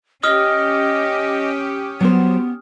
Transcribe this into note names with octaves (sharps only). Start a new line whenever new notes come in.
C#4 G4 D#5 D#6 F6
F#3 B3 C5